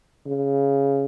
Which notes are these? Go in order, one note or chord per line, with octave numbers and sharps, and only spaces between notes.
C#3